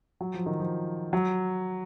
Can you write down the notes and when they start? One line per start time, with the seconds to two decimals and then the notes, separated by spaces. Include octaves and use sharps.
0.21 F#3
0.34 F3
0.46 D#3
0.60 F3
1.13 F#3